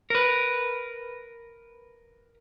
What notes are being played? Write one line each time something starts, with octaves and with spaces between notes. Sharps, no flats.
A#4 B4